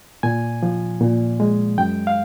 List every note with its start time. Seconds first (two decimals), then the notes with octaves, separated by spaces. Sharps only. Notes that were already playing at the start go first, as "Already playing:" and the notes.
0.23 A#2 G#5
0.63 F3
1.01 A#2
1.40 G#3
1.78 F#2 G5
2.07 F5